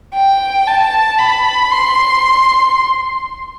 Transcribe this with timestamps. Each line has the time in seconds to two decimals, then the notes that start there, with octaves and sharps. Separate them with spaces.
0.14 G5
0.67 A5
1.19 B5
1.71 C6